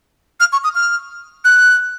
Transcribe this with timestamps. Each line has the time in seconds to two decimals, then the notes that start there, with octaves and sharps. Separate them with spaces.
0.40 F6
0.52 C#6
0.64 D#6
0.75 F6
1.44 F#6